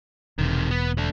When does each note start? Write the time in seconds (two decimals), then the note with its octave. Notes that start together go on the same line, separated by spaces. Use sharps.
0.38 E1 C3 D#3
0.71 B3
0.98 A3 D4